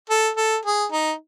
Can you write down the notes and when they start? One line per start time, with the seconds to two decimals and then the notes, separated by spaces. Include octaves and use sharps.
0.10 A4
0.37 A4
0.65 G#4
0.92 D#4